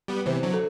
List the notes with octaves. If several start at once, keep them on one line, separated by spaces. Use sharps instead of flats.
G3 B3
C3 E3 C5
D3 F#3
A4